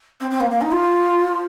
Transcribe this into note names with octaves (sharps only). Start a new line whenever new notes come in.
C4
C4
A#3
A#3
D#4
F4